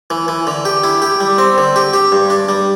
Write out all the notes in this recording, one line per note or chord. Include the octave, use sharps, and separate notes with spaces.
E3
E3
D3
G4
E4
G4
G3
C4
D3
G4
G4
G2
D4
G3